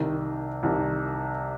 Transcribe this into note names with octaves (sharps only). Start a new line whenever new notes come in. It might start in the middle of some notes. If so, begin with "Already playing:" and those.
Already playing: C2 C3 D#3
C2 C3 D#3